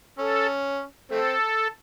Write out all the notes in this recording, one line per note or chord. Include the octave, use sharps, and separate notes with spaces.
C#4 A4
A3 C4 A4